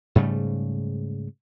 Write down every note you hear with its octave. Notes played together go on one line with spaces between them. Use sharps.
G#2 C#3 G3 A3